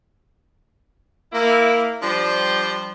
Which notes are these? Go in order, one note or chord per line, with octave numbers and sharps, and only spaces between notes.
A#3 E4
F3 G3 D4 C5